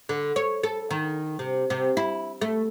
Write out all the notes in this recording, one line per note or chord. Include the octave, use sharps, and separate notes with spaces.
D3
C#5
A4
D#3
C3
C3
E4
A3